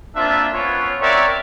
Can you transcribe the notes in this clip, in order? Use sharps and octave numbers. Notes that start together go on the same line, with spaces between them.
A#3 C4 D4 F4 E5
B3 C#4 F4 C#5
C4 A#4 C#5 D5 E5 F#5